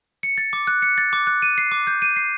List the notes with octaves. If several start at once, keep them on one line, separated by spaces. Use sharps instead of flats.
C#7
A6
D6
F#6
C#7
A6
D6
F#6
D#7
C7
D6
G6
D#7
C7